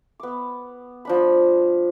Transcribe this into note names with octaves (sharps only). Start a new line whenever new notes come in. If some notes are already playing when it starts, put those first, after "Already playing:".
B3 D6
F3 D4 B5